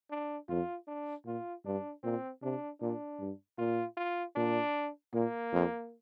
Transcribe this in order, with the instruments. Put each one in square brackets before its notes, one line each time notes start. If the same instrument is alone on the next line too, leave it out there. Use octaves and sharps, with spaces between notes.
[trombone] D4
[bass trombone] F2 [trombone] F4
[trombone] D4
[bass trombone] A#2 [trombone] F4
[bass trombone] G2 [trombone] D4
[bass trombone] A#2 [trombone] C4
[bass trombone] C3 [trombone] D4
[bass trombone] A#2 [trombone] D4
[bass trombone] G2
[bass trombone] A#2 [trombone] F4
[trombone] F4
[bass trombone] A#2 [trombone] D4
[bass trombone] A#2 [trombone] A#3
[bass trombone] F2